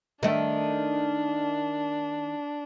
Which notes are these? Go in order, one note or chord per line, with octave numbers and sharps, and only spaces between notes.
D#3 A3 D4